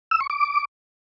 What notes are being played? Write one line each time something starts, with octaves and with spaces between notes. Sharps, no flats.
E6
C#6
D6